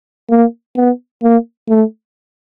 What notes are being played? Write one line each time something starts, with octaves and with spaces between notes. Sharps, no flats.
A#3
B3
A#3
A3